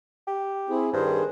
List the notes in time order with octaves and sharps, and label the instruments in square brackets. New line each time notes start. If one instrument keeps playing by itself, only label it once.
[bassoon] G4
[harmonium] C4 E4 G#4
[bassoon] G2 [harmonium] D#3 G#4 C5